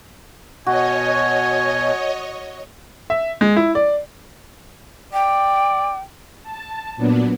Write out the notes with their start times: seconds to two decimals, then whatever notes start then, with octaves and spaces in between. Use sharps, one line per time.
0.67 B2 F#4 C#5 D#5 G#5
3.10 E5
3.41 G#3
3.56 E4
3.75 D5
5.13 D5 G5
6.43 A5
6.96 A#2 F#3 B3 D4